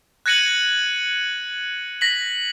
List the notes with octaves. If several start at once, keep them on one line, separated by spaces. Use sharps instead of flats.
F#6 G#6 A#6 C#7 D#7 F#7
A#6 B6 F#7